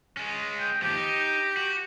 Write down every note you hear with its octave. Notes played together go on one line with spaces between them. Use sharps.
G#3 C#4
G5
D#2 F3 G4
D#4
F#4